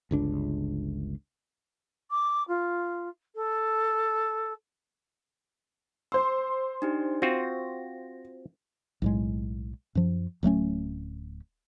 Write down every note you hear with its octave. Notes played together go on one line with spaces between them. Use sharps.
G1 C#2 D4
D6
F4
A4
C5 C6 E6
D4 D#4 G4
C4 F4 F#4 A#6
B1 A2 G#3
F#2 F3
D1 F#3 A3 C#4